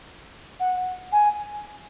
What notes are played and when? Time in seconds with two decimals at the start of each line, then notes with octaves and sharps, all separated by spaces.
0.60 F#5
1.12 G#5